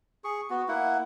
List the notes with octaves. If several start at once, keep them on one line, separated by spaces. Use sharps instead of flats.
G#4 C#6
B3 F#4
A#3 E4 F#5